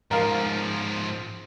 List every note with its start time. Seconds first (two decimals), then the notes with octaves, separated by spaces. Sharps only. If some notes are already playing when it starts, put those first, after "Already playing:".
0.11 G#2 F3 A#4 F5